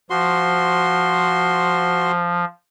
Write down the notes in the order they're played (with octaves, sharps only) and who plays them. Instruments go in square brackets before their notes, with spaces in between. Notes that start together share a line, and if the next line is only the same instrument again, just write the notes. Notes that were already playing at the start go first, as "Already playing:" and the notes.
[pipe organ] F3 [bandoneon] F#4 C6